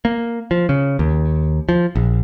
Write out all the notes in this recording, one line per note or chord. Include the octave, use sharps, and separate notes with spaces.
A#3
F3
C#3
D#2
F3
A#1